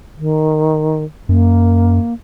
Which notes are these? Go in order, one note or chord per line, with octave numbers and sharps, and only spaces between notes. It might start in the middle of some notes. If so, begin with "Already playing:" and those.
D#3
F#2 A#3